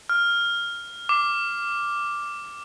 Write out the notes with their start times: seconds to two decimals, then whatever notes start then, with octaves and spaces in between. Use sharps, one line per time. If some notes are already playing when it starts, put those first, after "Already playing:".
0.09 F6
1.09 D6